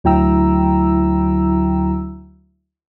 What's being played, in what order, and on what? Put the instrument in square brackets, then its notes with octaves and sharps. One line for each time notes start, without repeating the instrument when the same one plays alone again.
[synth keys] D2 F#3 E4 G5 A#5 E6